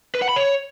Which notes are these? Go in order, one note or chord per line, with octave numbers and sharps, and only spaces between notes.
B4
F#5
B5
C#5